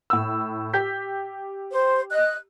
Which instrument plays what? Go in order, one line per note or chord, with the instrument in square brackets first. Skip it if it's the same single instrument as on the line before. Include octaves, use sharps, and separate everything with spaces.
[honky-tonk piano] A2 E6
G4 G6 B6
[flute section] C5
D#5 F#6